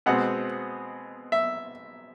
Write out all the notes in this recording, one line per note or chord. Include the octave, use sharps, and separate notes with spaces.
B2 G#3 C4 F#5
E5